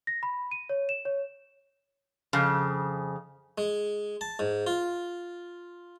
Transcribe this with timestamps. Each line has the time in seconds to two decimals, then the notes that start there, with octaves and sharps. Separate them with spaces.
0.07 A#6
0.23 B5
0.51 D#7
0.69 C#5
0.89 E7
1.05 C#5
2.33 F2 C#3
3.58 G#3
4.21 A5
4.39 G#2
4.67 F4